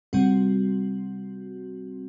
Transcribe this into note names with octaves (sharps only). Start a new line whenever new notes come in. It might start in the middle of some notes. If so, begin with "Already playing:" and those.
C3 G3 C4 F#4